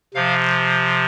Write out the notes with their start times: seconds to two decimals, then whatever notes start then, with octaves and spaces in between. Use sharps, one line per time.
0.14 C3 F3 F5